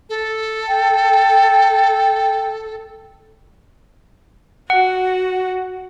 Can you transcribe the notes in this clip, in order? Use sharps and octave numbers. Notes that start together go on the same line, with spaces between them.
A4
G5
F#4 F#5